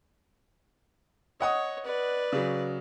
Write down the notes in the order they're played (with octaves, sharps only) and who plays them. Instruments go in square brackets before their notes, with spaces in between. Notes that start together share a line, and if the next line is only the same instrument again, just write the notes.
[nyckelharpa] C#5 [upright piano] D#5 F#5 D#6
[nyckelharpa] B4 D5
[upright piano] C#3 F#3